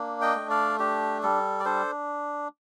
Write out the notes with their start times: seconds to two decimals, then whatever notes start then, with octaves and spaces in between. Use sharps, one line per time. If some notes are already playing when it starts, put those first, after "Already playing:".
Already playing: A#3 D4
0.21 D#5 G5
0.36 A3
0.50 D5 F5
0.79 D4 G4
1.23 G3 A4
1.60 D5
1.65 D4 A4 C5